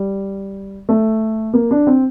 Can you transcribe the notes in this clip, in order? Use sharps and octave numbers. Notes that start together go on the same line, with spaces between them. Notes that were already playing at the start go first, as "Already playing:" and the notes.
Already playing: G3
A3
A#3
D4
C4